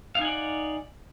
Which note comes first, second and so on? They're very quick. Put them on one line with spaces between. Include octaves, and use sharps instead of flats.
F5 D#4 G#5 F#5 D5